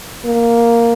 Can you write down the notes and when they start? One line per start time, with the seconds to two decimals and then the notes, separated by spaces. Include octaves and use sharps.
0.25 A#3